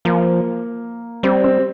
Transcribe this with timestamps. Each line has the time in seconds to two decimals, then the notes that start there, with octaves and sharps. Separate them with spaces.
0.05 F3 A#3
1.23 G3 C4
1.44 C4